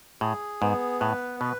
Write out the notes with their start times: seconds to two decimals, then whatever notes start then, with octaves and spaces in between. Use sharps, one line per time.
0.21 A2 G#4
0.62 G#2 B3
1.00 A2 B4
1.40 B2 B4